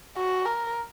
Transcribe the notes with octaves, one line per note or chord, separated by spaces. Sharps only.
F#4
A#4